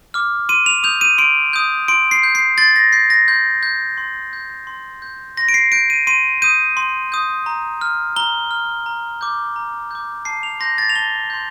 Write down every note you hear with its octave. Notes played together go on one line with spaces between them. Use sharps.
D6 F6
C6 D#7
F7
D#6 G6 F7
D#7
C6 D7
D#6 G6
C6 D7
C7
G6
C7
C6 A6
A#6
G6 C7
A#6
C6 G6
G6
C6
G6
C6
G6
C6 A#6
D7
C7
G6 D7
D#7
C6 D#7
D#6 G6 D#7
C6
D#6 G6
A#5
F6
A#5 G7
F6
A#5
D6 G6
A#5
D6 G6
A5 C7
F7
C6 G6 A#6
A6
F7
A5 G7
C6 G6